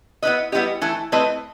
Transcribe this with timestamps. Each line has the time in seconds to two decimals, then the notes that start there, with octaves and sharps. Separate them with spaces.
0.22 B3 E4 B4 D#5
0.52 G3 B3 E4 G4 D#5
0.81 E3 A3 E4 A4
1.12 A3 C4 E4 B4 D#5